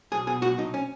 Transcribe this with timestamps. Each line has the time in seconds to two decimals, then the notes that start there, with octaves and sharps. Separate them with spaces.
0.12 B1 G#4
0.27 B2 G#4
0.42 B1 F#4
0.58 B1 D#4
0.74 C#4